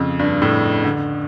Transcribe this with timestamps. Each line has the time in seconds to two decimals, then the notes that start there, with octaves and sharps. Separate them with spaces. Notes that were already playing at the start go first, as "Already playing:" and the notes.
Already playing: F2 C#3
0.19 G2
0.42 A2
0.84 D3